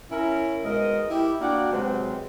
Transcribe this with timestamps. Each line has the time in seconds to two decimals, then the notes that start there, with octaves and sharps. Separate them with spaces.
0.10 C#4 E4 A#4
0.64 G#2 B2 G#3 A#4 D#5
1.09 E4 G4
1.41 A#3 D4 F#4 D5 F#5 G5
1.71 C3 F#3 G#3 B3 C4 C5